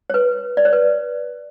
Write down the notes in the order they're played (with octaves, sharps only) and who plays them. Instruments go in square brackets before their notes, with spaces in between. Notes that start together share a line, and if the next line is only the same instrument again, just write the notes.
[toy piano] C#5
B4
D5
C#5
B4